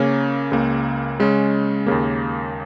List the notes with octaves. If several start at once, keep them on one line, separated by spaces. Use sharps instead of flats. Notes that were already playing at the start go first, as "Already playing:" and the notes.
Already playing: C#3 A#3 C#4
C#2 C#3 A#3
C#3 G#3 C#4
D#2 C#3 A#3